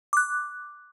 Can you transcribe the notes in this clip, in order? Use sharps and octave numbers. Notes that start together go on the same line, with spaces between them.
D6 F#6